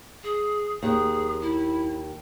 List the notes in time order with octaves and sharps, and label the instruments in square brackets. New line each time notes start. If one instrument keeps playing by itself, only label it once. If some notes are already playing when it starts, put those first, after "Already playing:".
[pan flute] G#4
[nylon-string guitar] D#2 [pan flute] G#4
[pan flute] E4